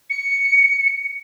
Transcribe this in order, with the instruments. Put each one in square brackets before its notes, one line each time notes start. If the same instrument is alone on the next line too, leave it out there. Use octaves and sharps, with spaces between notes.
[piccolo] C#7